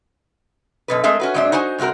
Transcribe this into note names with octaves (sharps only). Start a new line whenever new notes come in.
F#2 B2 B4
G#3 A3 C4 G#4 A#4 E5
C#4 F#4 B4
G#2 F#3 C4 D4 C5 E5
D#4 F#4 C5 G#5
G2 C3 C4 F#4 A#4